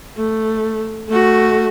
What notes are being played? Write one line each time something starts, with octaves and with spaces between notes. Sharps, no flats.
A3
A3 F#4